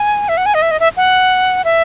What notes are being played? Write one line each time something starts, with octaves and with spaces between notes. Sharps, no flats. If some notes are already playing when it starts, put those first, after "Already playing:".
Already playing: G#5
E5
F#5
G#5
D#5
E5
D#5
E5
F#5
E5